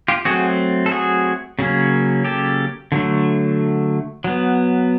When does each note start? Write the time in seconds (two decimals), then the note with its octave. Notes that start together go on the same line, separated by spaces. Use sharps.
0.08 F4 G4
0.25 F#3 A3 C4 F#4 G#4
0.86 A4
0.91 F#4 G#4
1.59 C#3 F#3 A#3 C#4
2.24 G4 A4
2.92 D3 F#3 A3
4.24 F#3 B3